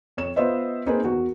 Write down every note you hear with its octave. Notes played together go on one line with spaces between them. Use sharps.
F2 C#5 E7
B3 F4 C5 D#5 E5
A#3 C4 D#4 G#4 B4
E2 F#4 A#4